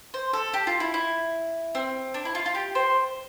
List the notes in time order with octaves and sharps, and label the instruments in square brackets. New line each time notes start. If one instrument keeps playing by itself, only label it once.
[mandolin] C5
A4
G4
F4
E4
E4
C4
D4
E4
F4
F4
G4
C5